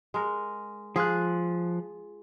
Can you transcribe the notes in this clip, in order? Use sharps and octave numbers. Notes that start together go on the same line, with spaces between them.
G#3 A#4
F3 F4 G#4 F#6